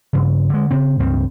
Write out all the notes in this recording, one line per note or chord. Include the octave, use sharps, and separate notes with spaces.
G2 C#3
D3 G#3
C#3 C4
C#2 G2 C4